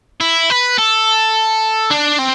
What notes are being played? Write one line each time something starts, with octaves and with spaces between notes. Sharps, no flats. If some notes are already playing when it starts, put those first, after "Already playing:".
E4
B4
A4
D4
C4